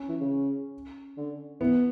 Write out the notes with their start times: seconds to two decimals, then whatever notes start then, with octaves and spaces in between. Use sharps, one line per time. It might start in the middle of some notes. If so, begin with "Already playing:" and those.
Already playing: C#4
0.09 E3
0.20 C#3
1.17 D3
1.61 E3 B3